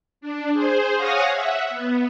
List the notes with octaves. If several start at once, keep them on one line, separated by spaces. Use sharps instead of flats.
D4
G#4 C5
C#5 F5 F#5 G#5 D#6 A#6
E5 F#5
B3